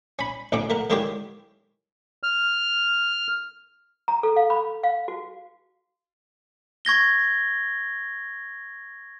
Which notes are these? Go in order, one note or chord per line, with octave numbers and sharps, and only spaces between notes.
C#4 B5
A1 D2 A2 C#4 D6
A3 A#4 F#5
D3 D#3 G#3 E4 G4 C#5
F6
A#5
A4
F5
B5
F5
F#4
C#6 G#6 A#6 G7